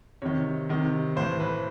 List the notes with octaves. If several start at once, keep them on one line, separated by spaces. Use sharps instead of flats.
C3 D#3 C#5
C3 D#3
A2 E3 C5
B4